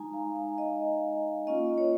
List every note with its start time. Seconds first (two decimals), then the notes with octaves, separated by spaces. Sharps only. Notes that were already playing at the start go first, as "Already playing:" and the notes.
Already playing: G#3 D#4 G#5 A#5
0.13 F5
0.36 F5
0.58 D#5
1.47 A#3 C#4 F4 D#5
1.78 C#5